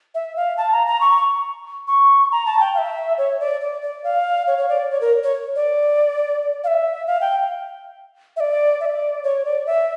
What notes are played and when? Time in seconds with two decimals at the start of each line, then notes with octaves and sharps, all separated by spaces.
0.15 E5
0.36 F5
0.57 A5
0.72 A#5
0.87 A#5
1.01 C#6
1.88 C#6
2.32 A#5
2.46 A5
2.60 G5
2.74 F5
2.78 E5
3.18 C#5
3.40 D5
3.61 D5
3.82 D5
4.04 F5
4.47 C#5
4.58 C#5
4.69 D5
4.91 C#5
5.01 A#4
5.24 C#5
5.56 D5
6.64 F5
6.67 E5
7.07 F5
7.21 G5
8.36 E5
8.40 D5
8.81 E5
8.86 D5
9.24 C#5
9.45 D5
9.66 E5